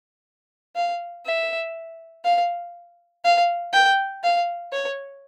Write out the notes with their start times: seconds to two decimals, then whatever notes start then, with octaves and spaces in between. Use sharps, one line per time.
0.76 F5
1.26 E5
2.25 F5
3.24 F5
3.73 G5
4.24 F5
4.72 C#5